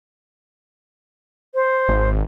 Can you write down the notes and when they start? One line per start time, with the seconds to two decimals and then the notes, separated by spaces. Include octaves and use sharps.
1.55 C5
1.89 G#1